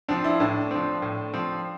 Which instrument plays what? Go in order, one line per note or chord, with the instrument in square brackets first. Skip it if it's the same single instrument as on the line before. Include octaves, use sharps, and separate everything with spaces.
[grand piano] F3 C4 [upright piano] D4
[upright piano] E4
[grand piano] A2 [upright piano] D4
[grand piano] F3 C4
A2
F3 C4